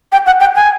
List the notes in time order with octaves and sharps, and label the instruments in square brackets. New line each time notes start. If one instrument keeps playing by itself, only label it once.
[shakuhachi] G5
F#5
G5
G#5